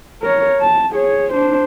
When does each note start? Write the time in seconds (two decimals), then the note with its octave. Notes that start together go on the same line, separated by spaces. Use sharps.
0.23 A#4 C#5
0.61 A5
0.91 G#4 C#5
1.33 D4 C5